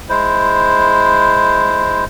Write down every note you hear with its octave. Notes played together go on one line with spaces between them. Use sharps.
G#3 E4 C5